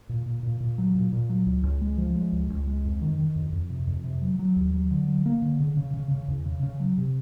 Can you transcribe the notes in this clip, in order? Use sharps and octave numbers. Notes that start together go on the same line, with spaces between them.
A#2
A#2
A#2
A#2
F#3
A#2
A#2
F#3
C#2
C#2
G#3
F3
G#3
C#2
C#2
G#3
F2
D#3
D#3
F2
F2
C3
F2
C3
F#3
F#3
D#2
F#3
D3
F#3
A#3
D3
C#3
C#3
C#3
C#3
E2
C#3
C#3
F#3
C3